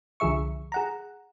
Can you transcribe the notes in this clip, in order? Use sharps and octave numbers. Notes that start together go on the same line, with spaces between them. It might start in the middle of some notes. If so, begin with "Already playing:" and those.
C2 D3 F3 G#4 E5 C#6
G#4 F#5 A#5